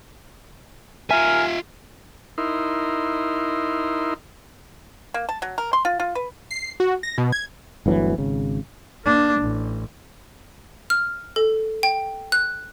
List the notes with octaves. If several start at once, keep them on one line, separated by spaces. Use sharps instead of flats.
F4 A#4 E5 G#5
D#4 E4 A#4 C6
A#3
A5
F#3
A#4
C6
F4
F4
B4
C7
F#4
A#6
B2
G#6
G1 D2 E3 F#3
G#1 C#3
A#3 D4
A1
F6
A4
G5
F#6